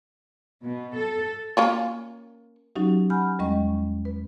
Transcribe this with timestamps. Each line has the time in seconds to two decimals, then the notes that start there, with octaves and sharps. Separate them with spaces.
0.63 B2
0.96 A4
1.57 A#3 C#4 F4
2.76 F#3 C#4 D#4 F#4 G4
3.10 F#5 G#5 B5 F6 G6
3.39 E2 G3 G#3 C#4 D#5 C#6
4.05 B4